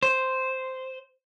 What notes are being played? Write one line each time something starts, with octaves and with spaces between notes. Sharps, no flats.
C5